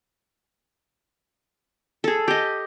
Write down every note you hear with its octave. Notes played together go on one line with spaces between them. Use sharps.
G#4 A4
G4 D#5